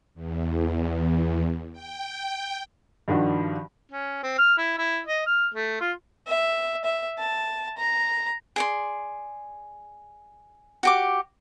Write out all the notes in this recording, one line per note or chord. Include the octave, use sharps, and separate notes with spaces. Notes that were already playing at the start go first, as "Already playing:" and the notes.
E2
G5
G2 D#3 F3 D4 F#4
C#4
C4
F6
E4
E4
D#5
F6
A3
F4
E5
E5
A5
A#5
G#4 D5 C6
F#4 G4 D6